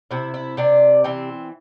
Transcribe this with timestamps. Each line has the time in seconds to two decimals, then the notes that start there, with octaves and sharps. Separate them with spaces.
0.11 C3 E4
0.34 E4
0.57 C3 D4
1.04 E3 C4